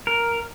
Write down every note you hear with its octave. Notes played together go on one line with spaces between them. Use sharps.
A#4